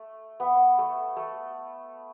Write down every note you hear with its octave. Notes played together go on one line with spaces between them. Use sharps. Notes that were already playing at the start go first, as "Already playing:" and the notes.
Already playing: A3
B3
A3
A3